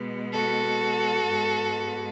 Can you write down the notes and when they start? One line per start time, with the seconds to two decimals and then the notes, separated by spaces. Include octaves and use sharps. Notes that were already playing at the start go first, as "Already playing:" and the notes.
Already playing: B2 G#3 B3
0.33 F#4 A4
1.27 G#2 G#3 B3